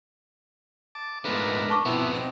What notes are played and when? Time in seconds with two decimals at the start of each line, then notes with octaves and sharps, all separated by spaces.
0.95 A5 D6
1.25 G#2 F3 G#3 A3 B3 D4 A#4 B4
1.70 A5 C#6 D6
1.85 B2 F3 B3 C4 E4
2.14 C4 D#4